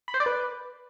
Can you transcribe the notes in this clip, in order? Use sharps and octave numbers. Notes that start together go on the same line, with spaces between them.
B5
C5
D5
B4